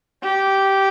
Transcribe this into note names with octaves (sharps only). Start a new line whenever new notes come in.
G4